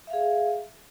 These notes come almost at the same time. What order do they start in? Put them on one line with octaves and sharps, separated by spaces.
E5 F5 G#4